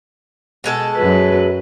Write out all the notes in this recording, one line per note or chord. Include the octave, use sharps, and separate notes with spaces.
B2 G#3 A4
F#2 F#3 B4